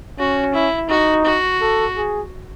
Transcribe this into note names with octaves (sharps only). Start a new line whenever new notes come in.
C#4 F#4
E4
D#4 F#4
F#4
A4
G#4